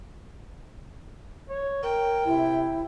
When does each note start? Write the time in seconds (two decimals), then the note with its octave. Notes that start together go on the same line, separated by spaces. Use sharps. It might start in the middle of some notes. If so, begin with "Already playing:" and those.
1.49 C#5
1.83 A#4 G5
2.25 C3 E4